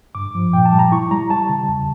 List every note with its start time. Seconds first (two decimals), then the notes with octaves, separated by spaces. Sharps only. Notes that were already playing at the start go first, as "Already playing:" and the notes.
0.15 G2 D6
0.35 F3
0.53 A#2 G5
0.66 A5
0.73 G3
0.79 A#5
0.92 E4 C#6
1.11 G3 A#5
1.30 G3 A5
1.49 C#3
1.68 E2